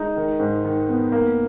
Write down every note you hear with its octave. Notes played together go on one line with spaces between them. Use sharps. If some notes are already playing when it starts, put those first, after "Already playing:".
Already playing: G#3 D#4
D#3
G#2
D#3
B3
A#3